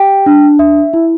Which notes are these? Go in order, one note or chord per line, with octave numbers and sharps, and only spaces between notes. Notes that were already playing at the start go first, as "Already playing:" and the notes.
Already playing: G4 G5
D4
E5
E4